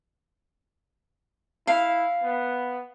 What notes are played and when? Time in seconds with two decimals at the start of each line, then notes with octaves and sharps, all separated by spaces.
1.67 E4 F5
2.24 B3